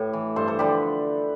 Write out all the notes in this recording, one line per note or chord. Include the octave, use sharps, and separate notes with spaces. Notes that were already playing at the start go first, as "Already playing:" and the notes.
Already playing: A2 G4 A4 B4
E3
G2 A4 C5
A4 C5
D3 F3 G4 B4